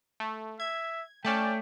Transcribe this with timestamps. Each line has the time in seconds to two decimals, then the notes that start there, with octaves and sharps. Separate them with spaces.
0.20 A3
0.60 E5 G#6
1.25 A3 C#4 D5 G5 A5